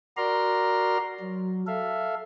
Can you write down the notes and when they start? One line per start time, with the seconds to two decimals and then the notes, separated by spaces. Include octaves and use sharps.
0.17 F#4 A#4 D5 A#5 C6 F6
1.20 F#3
1.67 A4 E5 F5